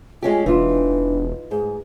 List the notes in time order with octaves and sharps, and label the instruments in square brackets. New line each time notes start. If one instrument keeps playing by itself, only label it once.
[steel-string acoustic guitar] G#3 C#4 G4 [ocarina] F4
[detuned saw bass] E1 [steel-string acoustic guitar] E3 [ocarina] D4 [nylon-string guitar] D#4 F4
[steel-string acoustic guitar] G#2 [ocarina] G#4